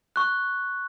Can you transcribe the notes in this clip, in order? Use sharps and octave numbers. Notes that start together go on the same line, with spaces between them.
C#6 F#6